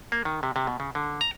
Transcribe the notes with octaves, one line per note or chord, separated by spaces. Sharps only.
A#3
D#3
C3
C3
B2
C#3
D3
A#5